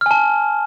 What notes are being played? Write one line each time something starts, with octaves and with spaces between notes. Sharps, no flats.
G#5 A5 F6